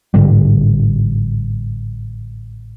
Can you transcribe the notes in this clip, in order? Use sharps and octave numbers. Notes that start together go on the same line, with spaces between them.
A1 G#2 D3 G3